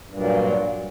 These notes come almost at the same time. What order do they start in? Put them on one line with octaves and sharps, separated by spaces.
G2 A#2 F#3